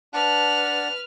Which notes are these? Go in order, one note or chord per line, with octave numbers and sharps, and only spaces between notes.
D4 B4 F#5 A5 F6